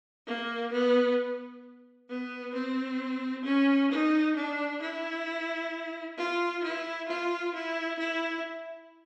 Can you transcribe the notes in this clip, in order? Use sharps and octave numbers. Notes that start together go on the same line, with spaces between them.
A#3
B3
B3
C4
C#4
D#4
D4
E4
F4
E4
F4
E4
E4